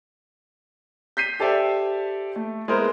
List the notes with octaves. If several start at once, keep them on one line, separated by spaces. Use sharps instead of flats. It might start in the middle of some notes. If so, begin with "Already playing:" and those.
G6 B6 C7 D#7
G4 A4 C5 D5 E5
A3
G#3 B3 E4 A#4 C5